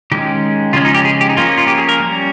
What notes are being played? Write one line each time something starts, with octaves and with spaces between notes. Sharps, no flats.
D#3 G#3 C#4 G4
C#3 F3 G#3 C#4 F4
D#4
G4
G#4
G4
D#4
F3 A#3 C#4 F4
F4
G4
G#4
A#4
G3 C#4